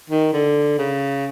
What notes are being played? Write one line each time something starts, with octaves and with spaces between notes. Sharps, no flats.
D#3
D3
C#3